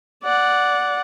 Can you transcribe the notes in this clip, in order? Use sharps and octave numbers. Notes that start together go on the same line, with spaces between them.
D5 F#5